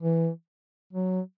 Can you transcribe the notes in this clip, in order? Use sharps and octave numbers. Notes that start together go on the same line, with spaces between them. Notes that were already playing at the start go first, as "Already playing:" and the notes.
E3
F#3